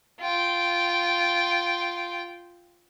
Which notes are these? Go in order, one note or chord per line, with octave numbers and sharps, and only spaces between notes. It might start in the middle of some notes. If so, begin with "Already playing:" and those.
F4 G5